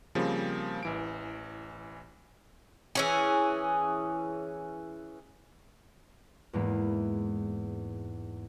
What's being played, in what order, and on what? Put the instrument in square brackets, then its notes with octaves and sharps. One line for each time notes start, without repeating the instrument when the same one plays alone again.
[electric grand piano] C#3 F3 G3 A#3 C4
A1 E3 D7
[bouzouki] E3 C#4 G#4
[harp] E2 G#2 E3 G#3 A#3 B3